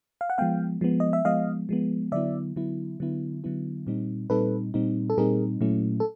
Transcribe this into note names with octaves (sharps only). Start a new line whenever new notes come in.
F5
F#5
F3 G#3 B3 F5 G5
F3 G#3 B3
D#5
E5
F3 G#3 B3 D#5 F5
F3 G#3 B3
D3 F#3 B3 E4 D5 E5
D3 F#3 B3 E4
D3 F#3 B3 E4
D3 F#3 B3 E4
A#2 G3 C4 D#4
A#2 G3 C4 D#4 A4 B4
A#2 G3 C4 D#4
A4
A#2 G3 C4 D#4 G#4 A#4
A#2 F#3 A3 C#4 E4
A4